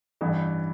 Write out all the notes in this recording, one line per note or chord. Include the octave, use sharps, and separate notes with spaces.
A1 G2 E3